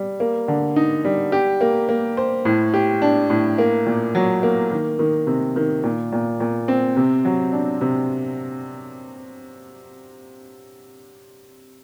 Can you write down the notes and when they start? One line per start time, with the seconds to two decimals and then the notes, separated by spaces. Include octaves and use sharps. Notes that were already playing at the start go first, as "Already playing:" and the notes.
Already playing: G3
0.20 A#3
0.48 D3
0.76 D#4
1.05 G3
1.32 G4
1.61 A#3
1.89 A#3
2.17 C5
2.45 A2
2.74 G4
3.02 D4
3.30 A2
3.58 A#3
3.86 A#2
4.15 F#3
4.43 A#3
4.71 D#3
4.99 D#3
5.27 C3
5.56 D#3
5.83 A#2
6.12 A#2
6.40 A#2
6.68 C4
6.97 C3
7.25 F#3
7.53 D4
7.81 C3